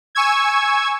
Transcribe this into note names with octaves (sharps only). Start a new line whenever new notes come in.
G#5 C#6 E6 G#6